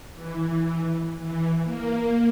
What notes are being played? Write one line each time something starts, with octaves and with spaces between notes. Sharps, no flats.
E3
E3
A#3